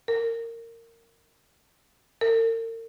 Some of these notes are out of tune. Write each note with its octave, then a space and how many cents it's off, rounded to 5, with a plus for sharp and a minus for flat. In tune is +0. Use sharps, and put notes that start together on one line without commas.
A#4 -20
A#4 -40